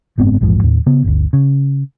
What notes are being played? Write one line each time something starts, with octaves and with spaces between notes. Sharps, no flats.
F#1 G#2 B3 C4
A#1 E2 G#2 F3
D#2 A2
C#3 B3
G1 D2
C#3